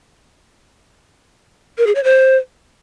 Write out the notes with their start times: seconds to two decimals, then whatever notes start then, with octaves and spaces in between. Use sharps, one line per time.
1.78 A#4
1.87 G#4
1.95 C#5
2.04 C5